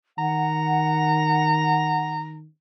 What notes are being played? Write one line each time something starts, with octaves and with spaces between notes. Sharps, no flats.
D#3 F#5 A#5